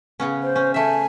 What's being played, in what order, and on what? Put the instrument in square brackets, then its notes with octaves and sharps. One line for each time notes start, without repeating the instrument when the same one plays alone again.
[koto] C#3 B3 C#4
[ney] C5
[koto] C#4
[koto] A3 E5 [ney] G#5